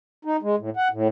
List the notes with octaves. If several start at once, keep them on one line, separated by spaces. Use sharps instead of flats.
D#4
G#3
A2
F#5
A2